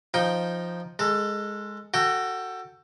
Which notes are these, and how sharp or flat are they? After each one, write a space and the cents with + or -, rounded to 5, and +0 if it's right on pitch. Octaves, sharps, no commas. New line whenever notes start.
F3 +0 D#4 +0 G5 +0
G#3 +0 A4 +20
F#4 +0 A4 +20 G5 +0